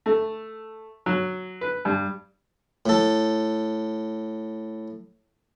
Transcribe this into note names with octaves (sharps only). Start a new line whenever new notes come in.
A3
F#3
B4
G2
A2 A4